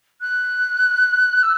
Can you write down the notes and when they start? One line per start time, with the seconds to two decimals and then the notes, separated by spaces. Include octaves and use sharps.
0.21 F#6
1.43 E6